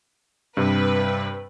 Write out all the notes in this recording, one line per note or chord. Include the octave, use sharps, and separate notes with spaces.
G2 C3 B4